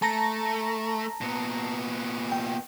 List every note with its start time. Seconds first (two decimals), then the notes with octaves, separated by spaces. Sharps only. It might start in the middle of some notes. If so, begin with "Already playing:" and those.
0.02 A3 A5 A#5 A#6
1.21 A#2 B3
2.32 G5